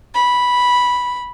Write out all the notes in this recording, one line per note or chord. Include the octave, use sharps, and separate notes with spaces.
B5